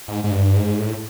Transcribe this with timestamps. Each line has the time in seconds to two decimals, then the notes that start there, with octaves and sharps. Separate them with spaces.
0.08 G#2
0.24 G#2
0.31 G2
0.56 G#2
0.79 A2